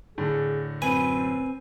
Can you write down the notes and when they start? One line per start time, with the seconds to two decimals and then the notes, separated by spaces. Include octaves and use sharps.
0.18 A2 D3 G#4
0.82 F#2 C4 B4 G#5